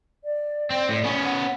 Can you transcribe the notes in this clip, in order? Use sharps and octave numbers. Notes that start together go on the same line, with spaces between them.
D5
C4
A2
B3 C#4
F#5